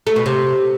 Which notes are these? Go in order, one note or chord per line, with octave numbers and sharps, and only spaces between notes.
A3
B2
C3